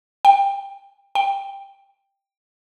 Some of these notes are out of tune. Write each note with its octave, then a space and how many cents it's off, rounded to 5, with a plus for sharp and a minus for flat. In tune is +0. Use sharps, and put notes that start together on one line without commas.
G5 +20
G5 +10